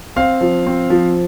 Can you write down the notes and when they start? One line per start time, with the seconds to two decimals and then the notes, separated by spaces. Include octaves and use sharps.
0.16 C4 F5
0.41 F3
0.67 C4
0.90 F3